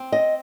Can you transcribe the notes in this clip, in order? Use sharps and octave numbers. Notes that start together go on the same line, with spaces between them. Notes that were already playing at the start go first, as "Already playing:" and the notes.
Already playing: C4
D#5